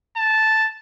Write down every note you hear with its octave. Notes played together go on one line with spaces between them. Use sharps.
A5